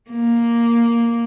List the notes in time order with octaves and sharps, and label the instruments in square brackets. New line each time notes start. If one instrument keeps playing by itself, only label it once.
[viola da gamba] A#3